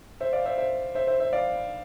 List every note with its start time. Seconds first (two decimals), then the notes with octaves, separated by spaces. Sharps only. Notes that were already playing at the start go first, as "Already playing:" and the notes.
0.20 C5 E5
0.33 D5 F5
0.45 C5 E5
0.58 C5 E5
0.95 C5 E5
1.07 C5 E5
1.20 C5 E5
1.33 D5 F5